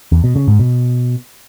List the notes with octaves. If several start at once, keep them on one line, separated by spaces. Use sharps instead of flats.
E2
B2
C#3
G#2
B2